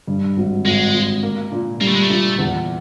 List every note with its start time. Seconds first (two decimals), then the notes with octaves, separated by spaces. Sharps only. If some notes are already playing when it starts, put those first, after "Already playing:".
0.07 G2
0.37 G#1
0.65 G#1 G#3
0.94 G#1
1.23 A#3
1.52 A#2
1.81 G3 A#3
1.88 A3
1.95 G#3
2.02 A3
2.10 A#2
2.38 E2